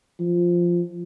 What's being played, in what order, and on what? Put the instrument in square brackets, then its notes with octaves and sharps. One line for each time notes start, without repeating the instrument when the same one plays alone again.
[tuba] F3